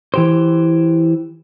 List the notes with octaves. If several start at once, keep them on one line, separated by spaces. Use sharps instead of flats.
E3 G4 C5